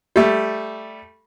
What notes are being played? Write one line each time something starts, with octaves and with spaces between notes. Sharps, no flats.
G3 A3